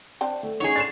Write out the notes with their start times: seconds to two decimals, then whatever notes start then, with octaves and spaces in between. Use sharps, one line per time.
0.21 C4 D4 G5
0.43 A3
0.60 C#4 D#4 G#4 C#5 F#5
0.76 D3 A6 C7 E7